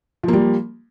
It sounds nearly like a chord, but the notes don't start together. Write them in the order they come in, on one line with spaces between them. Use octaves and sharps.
F3 A#3 G3